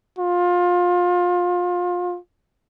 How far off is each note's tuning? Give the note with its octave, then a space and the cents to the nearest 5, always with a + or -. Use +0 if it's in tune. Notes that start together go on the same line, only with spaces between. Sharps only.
F4 +25